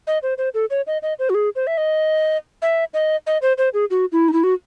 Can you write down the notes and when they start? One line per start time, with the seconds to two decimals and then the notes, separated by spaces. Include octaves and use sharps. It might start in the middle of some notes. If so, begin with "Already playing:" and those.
0.07 D#5
0.23 C5
0.38 C5
0.54 A4
0.70 C#5
0.87 D#5
1.02 D#5
1.19 C5
1.30 F#4
1.35 G#4
1.56 C5
1.67 E5
1.78 D#5
2.62 E5
2.94 D#5
3.27 D#5
3.42 C5
3.58 C5
3.74 G#4
3.90 F#4
4.12 E4
4.28 D#4
4.33 E4
4.44 F#4